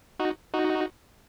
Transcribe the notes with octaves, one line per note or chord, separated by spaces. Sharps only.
D#4 F#4
D#4 F#4